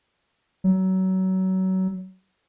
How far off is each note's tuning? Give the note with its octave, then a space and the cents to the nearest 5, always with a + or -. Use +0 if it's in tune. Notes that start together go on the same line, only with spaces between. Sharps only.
F#3 +25